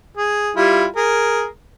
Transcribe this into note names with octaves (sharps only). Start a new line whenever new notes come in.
G#4
G3 E4 F4
G#4 A#4